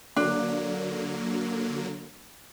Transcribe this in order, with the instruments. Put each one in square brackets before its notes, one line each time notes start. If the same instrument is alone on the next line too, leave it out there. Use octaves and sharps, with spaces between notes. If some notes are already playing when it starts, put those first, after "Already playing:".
[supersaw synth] D3 F#3 A#3 [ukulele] D4